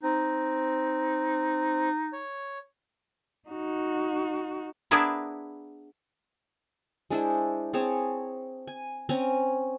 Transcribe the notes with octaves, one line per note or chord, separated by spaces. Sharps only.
C4 D#4
C#5
D#4 F#4
B3 D4 E4 G#4 A#4 B4
G#3 D4 E4 C5
C4 G#4 C#5 A5
G#5
C4 C#4 G#5 A#5